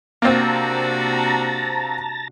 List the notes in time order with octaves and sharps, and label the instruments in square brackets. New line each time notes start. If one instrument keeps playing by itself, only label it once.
[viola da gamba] C3 D4 F#4 [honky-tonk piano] A#3 C4 [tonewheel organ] A5 A#5